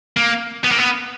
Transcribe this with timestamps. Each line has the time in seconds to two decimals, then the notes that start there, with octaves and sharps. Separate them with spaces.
0.17 A#3
0.64 B3
0.71 A#3
0.78 B3